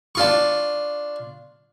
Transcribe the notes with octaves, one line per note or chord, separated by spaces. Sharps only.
D4 F4 C#6